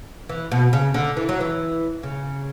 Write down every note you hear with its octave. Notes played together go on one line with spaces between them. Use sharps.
E3
B2
C#3
D3
E3
F#3
E3
C#3